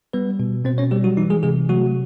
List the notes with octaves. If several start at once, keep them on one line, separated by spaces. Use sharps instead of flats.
G3 B3 B4
B2
B2 C4 C5
C#4 C#5
G3 G4
F#3 F#4
E3 D#4
G#3 G#4
C3 G#3 G#4
F#3 A3 F#4